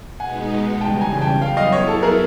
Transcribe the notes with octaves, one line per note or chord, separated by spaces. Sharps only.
B2 G#3 B3 D#4 F#5 G#5
C#3 E3 G3 G5 A5
G#5 A#5
G#5
G5 A5
F#3 B3 E4 F5 G5
D#5 F5
C#5 D#5
A4
G#4 A#4